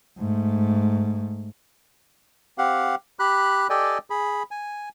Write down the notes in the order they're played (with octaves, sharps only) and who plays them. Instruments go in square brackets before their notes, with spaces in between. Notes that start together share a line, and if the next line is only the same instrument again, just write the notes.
[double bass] G#2 A3
[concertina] C4 G4 F5 F#5
G4 B5 F#6
G4 A4 D5 D#5 G5 G#5
G#4 B5
G#5